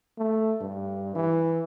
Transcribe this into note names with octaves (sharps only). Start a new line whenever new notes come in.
A3
G2
E3